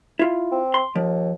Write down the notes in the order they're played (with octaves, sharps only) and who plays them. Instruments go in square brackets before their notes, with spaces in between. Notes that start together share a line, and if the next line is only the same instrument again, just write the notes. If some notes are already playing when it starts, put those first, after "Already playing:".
[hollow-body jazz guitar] E4 F4
[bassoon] C4
[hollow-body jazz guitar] C6
[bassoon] D#2 [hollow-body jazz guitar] F3